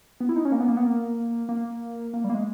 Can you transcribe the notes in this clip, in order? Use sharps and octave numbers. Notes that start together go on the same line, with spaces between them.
B3
E4
D#4
C#4
A#3
B3
A#3
B3
A#3
A#3
A#3
G3
A#3
G#3